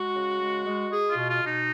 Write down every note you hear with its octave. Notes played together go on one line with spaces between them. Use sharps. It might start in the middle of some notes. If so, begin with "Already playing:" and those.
Already playing: G#3 F#4
C#3
G#3
G#3
G#3 G#4
F4
B2
F4
B2
D#4